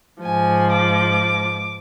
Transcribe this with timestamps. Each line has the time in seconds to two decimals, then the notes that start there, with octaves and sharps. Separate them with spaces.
0.23 G#2 F3 G#5
0.72 D6